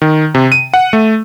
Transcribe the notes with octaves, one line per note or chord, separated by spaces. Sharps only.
D#3
C3
D#7
F#5
A3